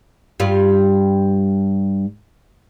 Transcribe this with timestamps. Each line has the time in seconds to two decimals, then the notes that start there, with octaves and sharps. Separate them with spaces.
0.40 G2 G3 F4